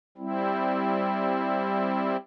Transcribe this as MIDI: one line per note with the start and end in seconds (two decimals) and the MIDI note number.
0.18 2.17 55
0.18 2.17 60
0.18 2.17 64